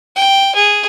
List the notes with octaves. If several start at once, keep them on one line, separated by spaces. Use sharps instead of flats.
G5
G#4